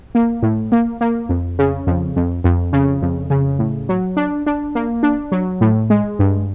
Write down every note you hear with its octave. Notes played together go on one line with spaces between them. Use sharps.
A#3
A2
A#3
A#3
F2
C#3
F2
F2
F2
C#3
F2
C#3
A2
F#3
D4
D4
A#3
D4
F#3
A2
G#3
G2